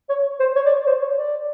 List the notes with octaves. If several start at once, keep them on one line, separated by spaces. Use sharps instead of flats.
C#5
C5
C#5
D5
C#5
C5
C#5
D5